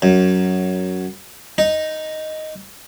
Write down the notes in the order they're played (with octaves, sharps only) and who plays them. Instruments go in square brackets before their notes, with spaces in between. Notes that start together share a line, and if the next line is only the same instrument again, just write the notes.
[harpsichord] F#2
D#4